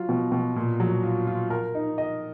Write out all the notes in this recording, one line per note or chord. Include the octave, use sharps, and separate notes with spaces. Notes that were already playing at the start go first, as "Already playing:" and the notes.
Already playing: F#3 F4
B2
B2
A#2
F#3
F4
F4
A#4
D#4
D#5